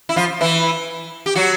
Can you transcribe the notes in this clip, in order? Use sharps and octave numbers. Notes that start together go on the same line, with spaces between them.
E4
F3 F4
E3 E4
G4
F#3 F#4